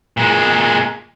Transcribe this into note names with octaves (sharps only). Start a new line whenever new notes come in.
A#2 G#3